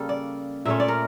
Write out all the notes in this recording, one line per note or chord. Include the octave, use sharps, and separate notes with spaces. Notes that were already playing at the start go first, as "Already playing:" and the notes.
Already playing: C#3 G3 A#3 C#4 A4
D5
A#2 A3 C#4 E5
D5
A#4